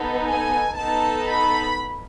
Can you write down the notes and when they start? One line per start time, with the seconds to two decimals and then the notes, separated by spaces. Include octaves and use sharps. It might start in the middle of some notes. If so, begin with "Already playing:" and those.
Already playing: B3 D#4 A4
0.27 G#5
0.78 B3 D#4 A4 A5
1.29 B5